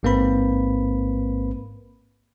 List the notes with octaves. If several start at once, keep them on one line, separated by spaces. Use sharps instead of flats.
A1 G#2 A#3 C4 B4 B5